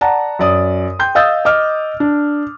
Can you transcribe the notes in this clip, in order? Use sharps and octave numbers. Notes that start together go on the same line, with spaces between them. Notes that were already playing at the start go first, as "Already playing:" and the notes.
D5 F#5 A5 A#5
F#2 D5 D#6
G5 C6 G6
D#5 F5 D#6 E6 G6 A6
D#5 D6 F6
D4